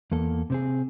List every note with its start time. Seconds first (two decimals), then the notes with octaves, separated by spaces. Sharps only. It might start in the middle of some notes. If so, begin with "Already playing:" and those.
0.11 E2 A#3 A4
0.50 C3 C4 G#4